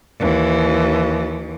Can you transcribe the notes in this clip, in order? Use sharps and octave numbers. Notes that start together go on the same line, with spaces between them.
D#2 E3